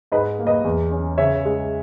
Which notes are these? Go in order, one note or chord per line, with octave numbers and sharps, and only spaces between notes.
G#2 B4 D#5
A#3
B4 D#5
E2
C#4
C#3 C#5 E5
G#3